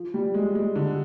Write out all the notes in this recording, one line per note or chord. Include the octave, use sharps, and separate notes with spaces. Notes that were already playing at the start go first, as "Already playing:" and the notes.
Already playing: F3
G3
G#3
G#3
D3